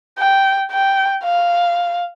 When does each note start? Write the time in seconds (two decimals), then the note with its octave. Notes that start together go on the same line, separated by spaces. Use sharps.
0.19 G5
0.72 G5
1.24 F5